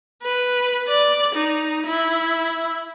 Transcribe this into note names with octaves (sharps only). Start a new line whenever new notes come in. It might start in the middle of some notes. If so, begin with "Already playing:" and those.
B4
D5
D#4
E4